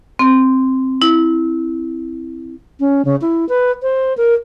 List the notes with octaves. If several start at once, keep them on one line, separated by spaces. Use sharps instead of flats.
C4
E4
C#4
C#3
E4
B4
C5
A#4